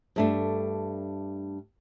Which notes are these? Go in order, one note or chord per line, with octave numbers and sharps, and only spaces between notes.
G2 A3 D4